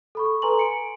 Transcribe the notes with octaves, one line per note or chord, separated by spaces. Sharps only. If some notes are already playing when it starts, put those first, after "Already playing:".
A4 B5 C#6
A4 B4 G#5 A#5 C6 F#7
G#5 C#7 D7